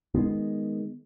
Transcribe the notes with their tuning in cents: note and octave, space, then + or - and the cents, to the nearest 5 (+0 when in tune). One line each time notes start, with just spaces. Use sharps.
D#3 +0 G#3 +0 B3 +0